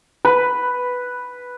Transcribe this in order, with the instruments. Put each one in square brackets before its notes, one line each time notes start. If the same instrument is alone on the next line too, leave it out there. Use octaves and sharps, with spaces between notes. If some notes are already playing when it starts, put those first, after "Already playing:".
[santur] B4